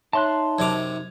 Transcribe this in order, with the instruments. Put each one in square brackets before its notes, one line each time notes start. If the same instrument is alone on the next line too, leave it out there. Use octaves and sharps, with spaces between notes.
[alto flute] D#4 [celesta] C#5 E5 [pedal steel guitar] A5 C6 F#6
[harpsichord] F#2 C3 D6 [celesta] G#6 F7